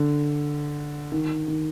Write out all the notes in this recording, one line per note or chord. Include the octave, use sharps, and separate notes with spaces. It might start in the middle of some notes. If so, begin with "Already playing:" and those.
Already playing: D3
D#3
D#3